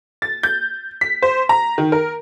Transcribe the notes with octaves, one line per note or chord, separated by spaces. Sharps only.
A6
G6
B6
C5
A#5
D#3
A#4